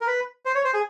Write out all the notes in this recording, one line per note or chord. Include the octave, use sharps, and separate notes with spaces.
A#4
B4
C5
C#5
C5
G#4